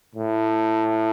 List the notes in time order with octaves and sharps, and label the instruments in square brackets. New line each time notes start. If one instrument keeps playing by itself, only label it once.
[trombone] A2